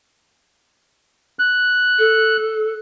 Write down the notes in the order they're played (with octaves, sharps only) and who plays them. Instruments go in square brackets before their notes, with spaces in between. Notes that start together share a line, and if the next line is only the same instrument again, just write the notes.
[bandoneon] F#6
[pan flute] A4